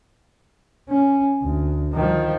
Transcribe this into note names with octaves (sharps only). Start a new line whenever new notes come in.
C#4
D2
D#3 F3